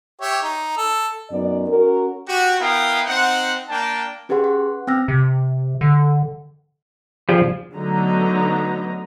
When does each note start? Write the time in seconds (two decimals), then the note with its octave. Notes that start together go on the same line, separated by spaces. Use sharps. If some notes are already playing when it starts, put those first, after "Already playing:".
0.21 G4 C#5 E5
0.43 D#4
0.77 A4
1.31 F#2 B3 D#4 D5
1.68 C#4 F#4 A#4
2.27 F#4 G4
2.60 B3 E4 A#4 F5 G5 D#6
3.07 C4 D#4 C5 F#5
3.69 A#3 D4 G5 A5
4.29 C#4 G4 G#4 B4 F#5 C6
4.44 F#5
4.87 C4 G5 E6 F6 A#6
5.08 C3
5.81 D3
7.29 F3 G4 G#4 D5
7.74 D3 F#3 A3 B3 D#4 A#5